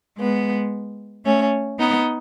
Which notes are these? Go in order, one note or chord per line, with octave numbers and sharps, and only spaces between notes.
G#3 B3
A3 C#4
B3 D#4